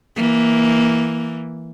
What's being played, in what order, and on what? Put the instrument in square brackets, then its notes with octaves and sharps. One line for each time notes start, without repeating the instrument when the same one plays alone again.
[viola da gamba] E3 A#3